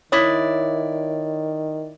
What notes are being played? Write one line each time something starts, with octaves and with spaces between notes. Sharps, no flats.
D#3 E4 C#5 D5 D#6